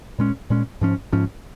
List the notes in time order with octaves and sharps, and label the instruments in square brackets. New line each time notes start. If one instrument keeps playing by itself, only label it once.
[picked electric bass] A#2 G#3 C#4
A#2 G#3 C#4
G#2 F3 C#4
G#2 F3 C#4